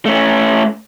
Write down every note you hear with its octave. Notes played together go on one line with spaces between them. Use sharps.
A3 C#4